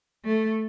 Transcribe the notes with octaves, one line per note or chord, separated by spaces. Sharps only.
A3